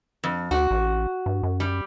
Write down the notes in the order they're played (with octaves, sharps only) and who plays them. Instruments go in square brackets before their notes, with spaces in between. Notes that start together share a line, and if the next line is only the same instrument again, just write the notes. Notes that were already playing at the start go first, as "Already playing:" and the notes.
[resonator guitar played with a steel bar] F2
[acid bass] D2 [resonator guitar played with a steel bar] F#4
[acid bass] A1
G2
F#2
[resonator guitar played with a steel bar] G3